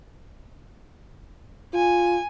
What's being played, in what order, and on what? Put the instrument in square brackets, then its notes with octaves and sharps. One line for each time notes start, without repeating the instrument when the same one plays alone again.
[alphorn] F4 [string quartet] G#5